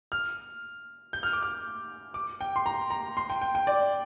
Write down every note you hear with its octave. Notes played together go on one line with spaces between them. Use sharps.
F6
G6
F6
D6
F6
D6
G5
C6
A#5
A#5
C6
G5
G5
G5
D5